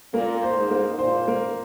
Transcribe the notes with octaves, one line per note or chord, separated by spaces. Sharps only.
A#2 A#3
C5
G#2
A#3
A#2 C5
A#3